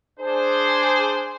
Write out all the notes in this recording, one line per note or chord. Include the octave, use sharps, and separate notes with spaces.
D4 G#4 C5